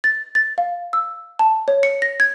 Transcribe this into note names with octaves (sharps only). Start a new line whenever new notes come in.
A6
A6
F5
E6
A5
C#5
C#7
A#6
G#6